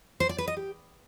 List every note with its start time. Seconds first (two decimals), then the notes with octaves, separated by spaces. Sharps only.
0.20 C5
0.29 D5
0.38 B4
0.48 D#5
0.57 G4